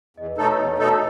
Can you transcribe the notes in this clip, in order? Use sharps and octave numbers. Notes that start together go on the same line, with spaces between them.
E2 D#5
B4
B2 A3 D#4 A4 C#5
B4
E2 C#5
B2 A3 D#4 A4